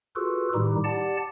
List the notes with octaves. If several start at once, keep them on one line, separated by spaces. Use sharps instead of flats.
F4 F#4 G#4 A4 B4
A2 D#3 G3 D#4 E4 G4
G4 D5 F#5 A5